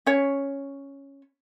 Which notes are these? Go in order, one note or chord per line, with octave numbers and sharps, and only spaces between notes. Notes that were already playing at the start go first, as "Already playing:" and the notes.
C#4 C#5